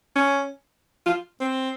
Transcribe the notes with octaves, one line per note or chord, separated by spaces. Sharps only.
C#4
F4
C4